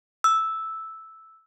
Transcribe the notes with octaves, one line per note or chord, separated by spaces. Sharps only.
E6